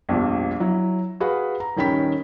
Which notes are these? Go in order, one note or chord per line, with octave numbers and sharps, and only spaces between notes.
A#1 F2 B2 G3
F#3 E4
F#4 G#4 B4 F5 B5
A#5
D#1 D#3 C#4 G5 B5 B6